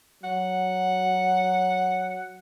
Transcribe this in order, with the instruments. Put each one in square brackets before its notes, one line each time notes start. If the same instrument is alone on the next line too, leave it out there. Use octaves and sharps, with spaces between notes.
[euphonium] F#3 [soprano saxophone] F#5